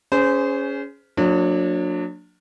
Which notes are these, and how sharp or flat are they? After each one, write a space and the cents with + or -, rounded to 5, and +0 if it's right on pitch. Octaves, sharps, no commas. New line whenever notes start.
C#4 +15 G#4 +0 C5 -25
F#3 -35 A#3 -30 D4 +0